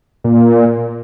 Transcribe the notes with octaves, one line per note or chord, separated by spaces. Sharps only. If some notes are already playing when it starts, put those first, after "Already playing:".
A#2